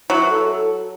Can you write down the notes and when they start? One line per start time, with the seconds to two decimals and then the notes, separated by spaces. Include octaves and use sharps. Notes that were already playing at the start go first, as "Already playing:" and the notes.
0.10 F#3 E4
0.26 B4
0.30 A4
0.49 A4